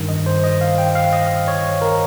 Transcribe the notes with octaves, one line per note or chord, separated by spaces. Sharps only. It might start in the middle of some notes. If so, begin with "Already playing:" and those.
Already playing: G2 D#3
D#5
C5
D#5
F5
G5
F5
D#5
C#5
A#4